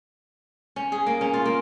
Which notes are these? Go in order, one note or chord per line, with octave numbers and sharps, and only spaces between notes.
C#4
G#4
A#3
C#4
F4
A#3